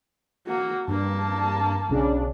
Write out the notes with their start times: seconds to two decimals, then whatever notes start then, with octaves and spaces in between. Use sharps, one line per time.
0.47 A#3 F#4
0.88 G2 A#3 A5
1.89 B1 C#3 D4